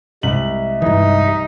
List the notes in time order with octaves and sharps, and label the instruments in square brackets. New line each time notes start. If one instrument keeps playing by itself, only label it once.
[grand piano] C2 F#7 [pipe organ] C3 G#3 E5
[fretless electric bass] G2 E3 [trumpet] D#4